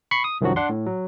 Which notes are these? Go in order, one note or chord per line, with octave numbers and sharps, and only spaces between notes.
B5 C#6 C7 C#7
D#6
C2 F#2 D#3 F3 F#3 F#4
D4 F#5 C6
A2
F#3